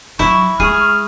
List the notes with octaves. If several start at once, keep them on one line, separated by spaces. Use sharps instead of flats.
F#3 E4 C#6
G#3 G#4 F6